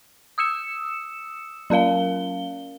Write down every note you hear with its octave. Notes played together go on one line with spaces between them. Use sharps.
D#6 E6 C#7 E7
F#3 C#4 A#4 F5 G7